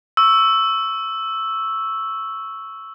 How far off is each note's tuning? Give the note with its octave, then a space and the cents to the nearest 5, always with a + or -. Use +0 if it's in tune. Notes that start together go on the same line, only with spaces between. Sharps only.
C#6 +0 E6 +0